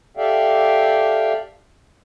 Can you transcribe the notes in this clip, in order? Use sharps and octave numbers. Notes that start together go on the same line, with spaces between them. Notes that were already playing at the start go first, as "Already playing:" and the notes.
G4 A4 D5 E5 F5 G5